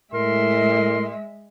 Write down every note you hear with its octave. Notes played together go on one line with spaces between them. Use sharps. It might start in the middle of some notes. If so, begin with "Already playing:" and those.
A2 G#3 A#4 E5 C6